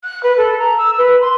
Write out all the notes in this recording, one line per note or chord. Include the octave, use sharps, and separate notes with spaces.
F#6
B4
A4
A#5
E6
B4
C6